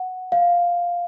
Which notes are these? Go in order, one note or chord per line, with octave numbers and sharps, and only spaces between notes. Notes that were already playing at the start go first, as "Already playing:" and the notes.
Already playing: F#5
F5